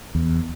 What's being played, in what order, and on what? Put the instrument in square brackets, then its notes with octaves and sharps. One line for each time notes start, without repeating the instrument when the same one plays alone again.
[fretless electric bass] E2